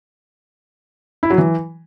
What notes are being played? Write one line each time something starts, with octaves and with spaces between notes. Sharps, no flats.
E4
F#3
E3